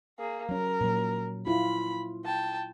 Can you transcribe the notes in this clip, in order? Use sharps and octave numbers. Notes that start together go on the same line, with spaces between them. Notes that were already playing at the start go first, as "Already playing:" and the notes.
A#3 G#4
F#3 C#4 A#4
A#2 F#3
E4 F4 B5
G5 A5